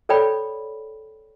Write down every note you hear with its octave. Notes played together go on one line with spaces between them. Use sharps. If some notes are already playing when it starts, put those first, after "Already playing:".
A4 C#5 D5 G5 B5